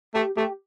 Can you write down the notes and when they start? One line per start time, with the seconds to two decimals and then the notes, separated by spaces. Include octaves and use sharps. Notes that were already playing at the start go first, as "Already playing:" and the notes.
0.14 A3 G4
0.37 A3 G4